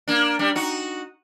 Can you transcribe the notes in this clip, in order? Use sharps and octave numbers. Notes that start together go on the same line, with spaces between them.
A#3 D4
G3 D4
D#4 F#4